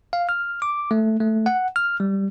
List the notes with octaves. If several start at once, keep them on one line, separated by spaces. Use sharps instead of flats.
F5
F6
D6
A3
A3
F#5
F6
G3